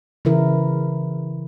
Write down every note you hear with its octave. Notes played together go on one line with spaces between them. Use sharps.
C#3 E3 E4 A#4